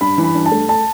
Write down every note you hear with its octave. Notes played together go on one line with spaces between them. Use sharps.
G2 B5
E3
B5
G2
A5
A3
A5